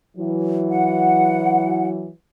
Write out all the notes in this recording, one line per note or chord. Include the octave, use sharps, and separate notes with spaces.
E3 F#3 E4
F#5